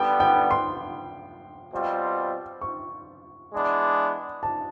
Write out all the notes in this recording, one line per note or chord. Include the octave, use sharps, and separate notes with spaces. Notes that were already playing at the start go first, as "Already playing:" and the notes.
Already playing: D3 G3 B3 G5
G5
C6
B2 G3 C4 F4
C#6
E3 G#3 B3 D4
A5